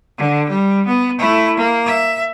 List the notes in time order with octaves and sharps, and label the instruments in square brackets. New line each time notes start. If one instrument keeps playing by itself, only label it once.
[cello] D3
G3
B3
A3 E4
A#3
E5